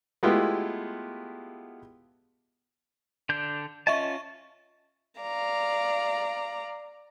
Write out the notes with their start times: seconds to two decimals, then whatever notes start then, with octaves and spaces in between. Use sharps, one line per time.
0.23 G#3 A3 B3 E4 F4 G4
3.29 D3 D4 G6
3.87 C#4 F4 D#5 E5 A5 C#6
5.21 D5 F5 A#5